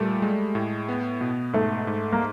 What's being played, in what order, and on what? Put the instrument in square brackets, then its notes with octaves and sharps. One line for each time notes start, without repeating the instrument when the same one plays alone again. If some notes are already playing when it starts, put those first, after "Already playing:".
Already playing: [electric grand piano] A#2 G3 [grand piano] A3
[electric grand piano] G#3
A2
B3
B2
[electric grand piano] G#2 [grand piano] A3
[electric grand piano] G#2
[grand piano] A#3